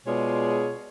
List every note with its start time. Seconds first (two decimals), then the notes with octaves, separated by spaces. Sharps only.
0.07 B2 G#3 F4 G#4 C#5 D5